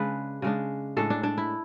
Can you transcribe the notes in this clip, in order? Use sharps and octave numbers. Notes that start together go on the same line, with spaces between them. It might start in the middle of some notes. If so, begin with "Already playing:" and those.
Already playing: C#3 G#3 D4 B4
C#3 G#3 D4
A2 G#3 D4 A4
D4
D4
E4